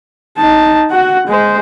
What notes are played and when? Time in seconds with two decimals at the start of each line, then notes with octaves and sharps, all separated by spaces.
0.38 D#4 A5
0.92 F#4 F#5
1.27 G#3 C5